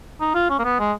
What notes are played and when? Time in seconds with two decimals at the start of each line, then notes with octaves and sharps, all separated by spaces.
0.21 D#4
0.35 F4
0.50 C#4
0.59 A#3
0.64 B3
0.79 G#3